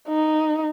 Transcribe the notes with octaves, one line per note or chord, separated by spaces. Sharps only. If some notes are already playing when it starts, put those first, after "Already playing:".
D#4